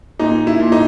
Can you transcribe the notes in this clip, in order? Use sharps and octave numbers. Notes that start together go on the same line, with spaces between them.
A#2 D#4
E4
A#2
D#4